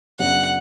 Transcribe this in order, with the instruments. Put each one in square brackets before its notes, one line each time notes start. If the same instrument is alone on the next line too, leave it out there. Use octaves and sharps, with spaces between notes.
[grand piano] F#2 C#3 F#3 B3 D4 [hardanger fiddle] F#5